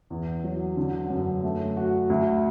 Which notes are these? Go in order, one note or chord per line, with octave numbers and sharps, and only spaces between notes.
E2
F#3
D3
F#2
A3
F#4
D2